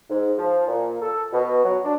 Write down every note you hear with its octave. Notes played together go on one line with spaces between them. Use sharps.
G#2
F3
A#2
A4
B2
F#3
D4